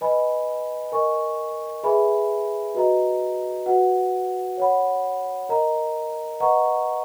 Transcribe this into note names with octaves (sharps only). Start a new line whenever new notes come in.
B4 D#5 G#5 B5
A#4 D#5 G#5 C#6
G#4 B4 E5 G#5 B5
F#4 B4 D#5 A#5
F#4 B4 F#5
C#5 F#5 B5
A#4 D#5 A#5
B4 D#5 F#5 A#5 C#6